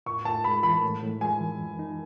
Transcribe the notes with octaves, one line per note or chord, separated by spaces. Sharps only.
A2 C#6
A2 A5
G#3 B5
E3 B5
A2
A2
G#3 G#5
E3
F#2
D#4